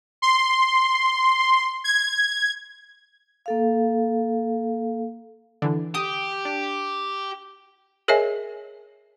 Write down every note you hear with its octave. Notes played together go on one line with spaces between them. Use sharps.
C6
G#6
A#3 A4 F5
D3 E3
G4 D#6
D4
G#4 A#4 C#5 D#5 E5 G#5